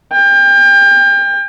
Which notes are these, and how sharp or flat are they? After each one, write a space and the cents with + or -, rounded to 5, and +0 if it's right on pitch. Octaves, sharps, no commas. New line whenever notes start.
G5 +35